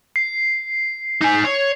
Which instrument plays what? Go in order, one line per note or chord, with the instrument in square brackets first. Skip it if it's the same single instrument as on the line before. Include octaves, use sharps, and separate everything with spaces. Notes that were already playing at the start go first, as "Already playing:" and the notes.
[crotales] C7
[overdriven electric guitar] D#4 G#5
C#5